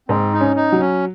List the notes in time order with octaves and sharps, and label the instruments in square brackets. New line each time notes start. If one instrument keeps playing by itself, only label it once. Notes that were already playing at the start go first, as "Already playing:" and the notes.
[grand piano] G#2 [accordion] C4
[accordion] D#4
[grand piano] C#4
[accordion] D#4
[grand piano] F#3
[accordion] C#4